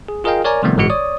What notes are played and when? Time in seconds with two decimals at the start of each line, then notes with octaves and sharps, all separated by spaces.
0.08 G#4
0.24 F4 G#4 A#4 D#5 F5 G5
0.44 A#4 C#5 D5 G#5 A#5
0.63 C3 D#3 F3 G3 A3 B3
0.76 G1 A2 E3 G#3 F#4 C#7
0.90 C#5 D5 D#6